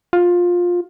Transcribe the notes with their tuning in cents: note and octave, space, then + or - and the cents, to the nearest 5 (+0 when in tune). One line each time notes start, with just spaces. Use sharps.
F4 +15